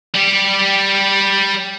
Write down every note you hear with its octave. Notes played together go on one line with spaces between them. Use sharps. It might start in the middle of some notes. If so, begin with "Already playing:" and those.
G3 G4